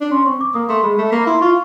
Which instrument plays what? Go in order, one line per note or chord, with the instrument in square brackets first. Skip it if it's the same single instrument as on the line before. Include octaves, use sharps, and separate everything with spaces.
[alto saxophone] D4
[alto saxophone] C#4 [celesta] C6
[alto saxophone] C4 [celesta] C#6
[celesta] D6
[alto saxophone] A#3 [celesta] D#6
[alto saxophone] A3 [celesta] C6
[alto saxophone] G#3 [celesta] B5
[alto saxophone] A3
A#3
[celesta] B5
[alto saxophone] E4 [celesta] C6
[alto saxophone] F4 [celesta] C#6